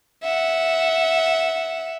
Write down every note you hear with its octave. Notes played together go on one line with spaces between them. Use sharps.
E5 F#5